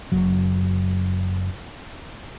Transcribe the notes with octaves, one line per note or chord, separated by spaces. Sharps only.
F#1 F#2 F#3